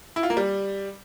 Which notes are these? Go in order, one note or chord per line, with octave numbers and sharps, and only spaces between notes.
E4
F4
A#3
G3